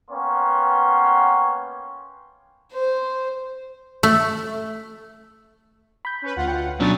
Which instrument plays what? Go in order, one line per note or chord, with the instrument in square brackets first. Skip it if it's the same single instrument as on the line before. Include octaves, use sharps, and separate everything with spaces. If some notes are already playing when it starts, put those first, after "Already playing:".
[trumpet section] A#3 B3 C#4 C#5 G5 C6
[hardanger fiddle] C5
[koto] A3
[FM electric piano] B5 G6
[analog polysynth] C#4 B4
D2 F4 F#5
[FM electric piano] G5
[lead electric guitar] B2 F#3 [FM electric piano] C#4 D4 A6 [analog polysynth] D#6